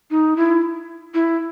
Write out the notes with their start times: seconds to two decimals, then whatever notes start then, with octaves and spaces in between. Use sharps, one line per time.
0.11 D#4
0.37 E4
1.14 E4